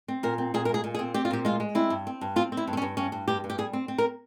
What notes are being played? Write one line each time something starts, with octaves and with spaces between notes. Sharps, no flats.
C4
A#2 A#4
C4
A#2 G#4
A#4
G#3
G#4
A#2
G#4
C4
C4 G4
F4
A#2 G4
G#3 F4
G#3
C4 E4
G2
C4
G2
C4 F4
C4
E4
G2
C4
C#4
G2
G2 C#4
G2
G2 G4
G2
G4
G3 G#4
C4
C4
A#4